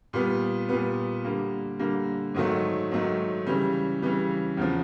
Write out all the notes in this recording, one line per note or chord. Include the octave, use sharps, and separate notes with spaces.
A#2 G3 B3
A#2 G3 B3
D3 G3 A#3
D3 G3 A#3
G#2 D#3 F#3 A3
G#2 D#3 F#3 A3
C#3 E3 G3
C#3 E3 G3
E2 C#3 F3